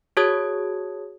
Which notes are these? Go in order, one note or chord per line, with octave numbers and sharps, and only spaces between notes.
F#4 G#4 C#5 A5 D#6 G#6